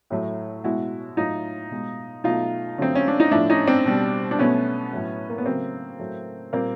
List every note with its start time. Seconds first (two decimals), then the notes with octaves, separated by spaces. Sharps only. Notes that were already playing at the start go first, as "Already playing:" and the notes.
0.10 A2 F#3 A3
0.64 B2 G#3 E4 F#4
1.17 A2 F#3 A3 D#4 F4
1.71 B2 G#3
2.24 B2 F#3 A3 D#4 F4
2.78 D3 F#3 A3 C4
2.95 C#4
3.08 D4
3.20 D#4
3.31 A2 F3 A3 D4 E4
3.49 C#4 D#4
3.67 C4 D4
3.85 B2 G3
4.31 D4
4.39 B2 F#3 A3 B3 C#4
4.92 A2 F#3 A3
5.29 A#3
5.38 B3
5.46 C#3 F#3 A3 A#3 C4
5.99 A2 F#3 A3
6.53 A#2 G3 A#3 C4